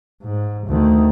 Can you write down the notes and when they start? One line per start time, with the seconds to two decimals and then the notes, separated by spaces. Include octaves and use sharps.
0.23 G#2
0.67 D2 D#3